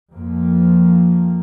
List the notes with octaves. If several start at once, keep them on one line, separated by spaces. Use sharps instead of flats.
F2 F3 A#3